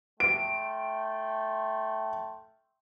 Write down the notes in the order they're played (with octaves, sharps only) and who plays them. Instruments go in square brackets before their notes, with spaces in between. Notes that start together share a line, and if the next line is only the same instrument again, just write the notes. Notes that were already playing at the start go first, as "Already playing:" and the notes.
[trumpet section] A3 G5 C6 [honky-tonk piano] D7